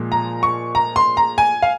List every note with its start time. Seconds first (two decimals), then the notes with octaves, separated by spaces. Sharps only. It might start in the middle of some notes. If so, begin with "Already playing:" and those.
Already playing: A#2 F3 G#3
0.12 A#5
0.43 C#6
0.75 A#5
0.96 C6
1.17 A#5
1.38 G#5
1.62 F5